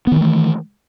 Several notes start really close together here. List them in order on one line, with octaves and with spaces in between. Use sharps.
B3 D#3 E3 A3